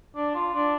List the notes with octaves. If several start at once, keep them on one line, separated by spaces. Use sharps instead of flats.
D4
F4
D4